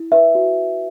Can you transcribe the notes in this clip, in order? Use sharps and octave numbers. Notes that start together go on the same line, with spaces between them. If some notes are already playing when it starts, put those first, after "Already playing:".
Already playing: E4
B4 E5
F#4